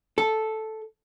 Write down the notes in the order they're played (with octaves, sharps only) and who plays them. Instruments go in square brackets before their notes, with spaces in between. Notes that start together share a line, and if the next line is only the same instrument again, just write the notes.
[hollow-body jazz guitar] A4